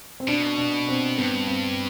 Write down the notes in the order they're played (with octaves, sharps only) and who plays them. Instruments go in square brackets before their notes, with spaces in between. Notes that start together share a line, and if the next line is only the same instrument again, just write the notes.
[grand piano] C4
[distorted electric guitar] B2 [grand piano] D4
[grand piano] D4
C4
[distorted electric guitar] G2 [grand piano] B3
[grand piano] C4